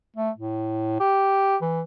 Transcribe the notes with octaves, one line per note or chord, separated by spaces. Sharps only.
A3
A2
G4
E3